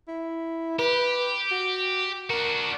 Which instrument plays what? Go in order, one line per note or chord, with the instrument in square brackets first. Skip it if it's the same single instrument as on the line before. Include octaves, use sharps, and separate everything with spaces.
[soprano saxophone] E4
[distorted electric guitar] G4 [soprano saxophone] B4
[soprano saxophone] F#4
[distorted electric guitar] D4 F#4 [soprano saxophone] A#4